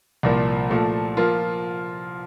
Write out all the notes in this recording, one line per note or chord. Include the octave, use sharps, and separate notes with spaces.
C2 A#2 F3 A#3
A#2 F3 A3
F3 A#3 F4